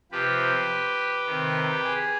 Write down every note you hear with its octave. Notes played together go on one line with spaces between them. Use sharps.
C3 F3 G4 B4
C3 D#3
G#4